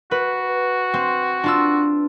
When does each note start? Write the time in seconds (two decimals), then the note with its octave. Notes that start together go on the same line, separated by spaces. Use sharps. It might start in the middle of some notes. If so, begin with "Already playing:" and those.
0.11 F#4 B4
0.94 C4
1.44 D4 F4 E6